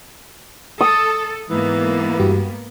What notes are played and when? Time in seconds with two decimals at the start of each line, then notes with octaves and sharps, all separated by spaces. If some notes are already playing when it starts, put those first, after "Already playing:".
0.81 A4 D#6
1.49 G#2 E3 A#3 B3
2.20 G2 F#4 G4